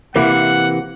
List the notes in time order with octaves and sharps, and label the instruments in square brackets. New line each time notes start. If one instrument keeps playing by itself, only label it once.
[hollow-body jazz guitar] C3 E3 A#3 [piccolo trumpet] F#5